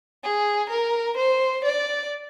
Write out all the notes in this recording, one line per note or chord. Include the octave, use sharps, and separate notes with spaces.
G#4
A#4
C5
D5